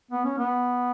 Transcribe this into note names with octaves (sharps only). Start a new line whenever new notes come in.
B3
C#4
B3